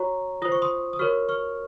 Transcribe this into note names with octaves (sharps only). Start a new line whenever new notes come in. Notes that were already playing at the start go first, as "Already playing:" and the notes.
Already playing: F#4 C#5 A#5 C#6
F4 C5 D#6
C#6
C6 D#6
D#6
F#4 A#4 C#5 C#6 F6
C#6 F6